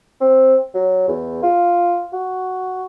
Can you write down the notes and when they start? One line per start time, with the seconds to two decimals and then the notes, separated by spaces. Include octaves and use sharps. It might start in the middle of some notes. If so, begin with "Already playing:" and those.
0.21 C4
0.74 F#3
1.08 E2
1.42 F4
2.13 F#4